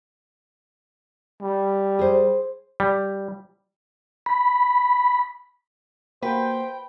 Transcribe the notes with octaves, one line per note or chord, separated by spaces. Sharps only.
G3
G#4 C5
G3
B5
A#3 F#4 B4 C5 G5